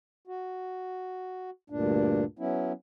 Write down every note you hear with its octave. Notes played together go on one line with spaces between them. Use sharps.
F#4
D2 G2 A#2 D4
F#3 B3 C#4 E4